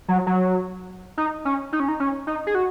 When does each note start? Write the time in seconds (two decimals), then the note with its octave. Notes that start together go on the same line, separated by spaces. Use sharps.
0.08 F#3
0.27 F#3
1.17 D#4
1.45 C#4
1.73 D#4
1.80 C#4
1.88 D#4
2.00 C#4
2.27 D#4
2.47 G#4
2.55 F#4